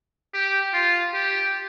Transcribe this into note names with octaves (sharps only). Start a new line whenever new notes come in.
G4
F4
G4